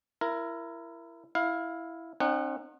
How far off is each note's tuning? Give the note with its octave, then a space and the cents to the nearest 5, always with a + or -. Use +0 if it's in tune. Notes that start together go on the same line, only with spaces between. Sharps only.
E4 +25 A#4 +0
E4 +0 F5 +15
C4 +40 D#4 -40 F#5 +0